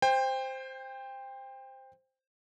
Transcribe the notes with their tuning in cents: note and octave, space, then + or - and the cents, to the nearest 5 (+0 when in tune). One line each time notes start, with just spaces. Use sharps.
C5 +0 G5 +25